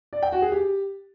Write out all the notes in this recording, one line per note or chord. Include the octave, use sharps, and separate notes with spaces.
D5
G5
F#4
G#4
G4